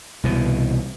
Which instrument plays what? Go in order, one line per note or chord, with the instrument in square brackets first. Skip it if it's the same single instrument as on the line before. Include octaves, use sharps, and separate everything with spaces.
[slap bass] C2 B2 E3